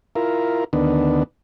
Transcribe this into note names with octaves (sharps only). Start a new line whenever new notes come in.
E4 F4 A#4
D2 D#3 B3 D4